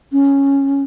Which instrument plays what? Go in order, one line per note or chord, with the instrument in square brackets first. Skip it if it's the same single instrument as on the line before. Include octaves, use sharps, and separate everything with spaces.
[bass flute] C#4